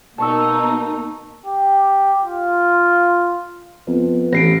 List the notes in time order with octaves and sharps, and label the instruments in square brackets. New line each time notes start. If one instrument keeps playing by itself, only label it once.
[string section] B2 A#3 D#4 [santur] A5 C#6 E6
[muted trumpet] G4
F4
[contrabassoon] F2 [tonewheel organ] B3
[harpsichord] A1 [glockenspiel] A#6 C7 D7